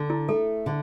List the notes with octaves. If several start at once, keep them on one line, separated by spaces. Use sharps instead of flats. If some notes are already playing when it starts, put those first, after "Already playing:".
Already playing: D3
E4
A3 A4
D3